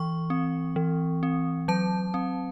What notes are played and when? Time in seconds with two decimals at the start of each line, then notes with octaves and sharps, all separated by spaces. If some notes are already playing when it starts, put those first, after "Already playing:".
Already playing: E3 C#6
0.30 C4
0.76 E3
1.23 C4
1.68 F#3 A5
2.14 C4